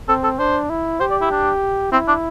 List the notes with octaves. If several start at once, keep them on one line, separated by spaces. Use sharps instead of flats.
C4 A4
A4
D4 C5
E4
G4 C5
D5
E4
D4
C4 E4
D4